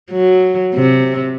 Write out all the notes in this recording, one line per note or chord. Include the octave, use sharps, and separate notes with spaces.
F#3
C3